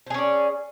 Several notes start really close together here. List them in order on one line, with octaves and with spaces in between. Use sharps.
C5 G#4 C#4 D5